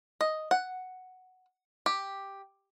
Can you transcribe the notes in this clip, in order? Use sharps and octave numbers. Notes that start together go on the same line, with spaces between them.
D#5
F#5
G4